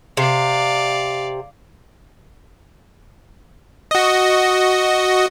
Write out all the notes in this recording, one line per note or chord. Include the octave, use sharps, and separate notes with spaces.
C3 D5 F5
F#4 D#5